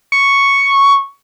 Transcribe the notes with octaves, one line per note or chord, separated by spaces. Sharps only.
C#6